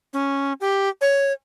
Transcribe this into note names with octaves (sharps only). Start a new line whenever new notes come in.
C#4
G4
C#5